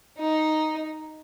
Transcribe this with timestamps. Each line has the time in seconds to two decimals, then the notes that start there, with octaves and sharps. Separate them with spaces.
0.18 D#4